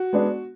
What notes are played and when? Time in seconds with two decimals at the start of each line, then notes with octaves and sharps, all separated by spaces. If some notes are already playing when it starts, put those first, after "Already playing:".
Already playing: F#4
0.13 G#3 B3 D4